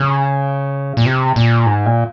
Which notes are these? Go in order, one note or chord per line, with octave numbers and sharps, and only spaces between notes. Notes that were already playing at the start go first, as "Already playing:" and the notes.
Already playing: C#3
A#2
C3
A#2
G#2
A#2